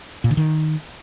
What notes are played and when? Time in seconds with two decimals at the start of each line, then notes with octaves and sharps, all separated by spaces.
0.24 A#2
0.31 D3
0.37 D#3